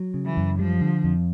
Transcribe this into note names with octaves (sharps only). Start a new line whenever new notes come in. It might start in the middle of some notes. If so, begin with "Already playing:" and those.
Already playing: F#3
C#3
E3
F#2
F3 G3
D3
F2